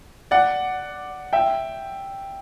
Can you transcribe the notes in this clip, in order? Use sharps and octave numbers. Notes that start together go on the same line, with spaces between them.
D5 F#5
E5 G5